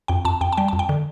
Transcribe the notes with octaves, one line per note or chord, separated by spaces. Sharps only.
F2 G5
F2 A5
F2 G5
A5
G3 G5
A5
F2
G5
D3